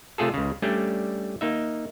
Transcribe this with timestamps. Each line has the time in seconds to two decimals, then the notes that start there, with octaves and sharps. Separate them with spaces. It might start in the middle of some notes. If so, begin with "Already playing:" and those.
0.18 C3 A3 F4 G#4 A4
0.34 C#2 C#3
0.62 G3 A3 C#4 D4
1.41 A#3 D#4 E5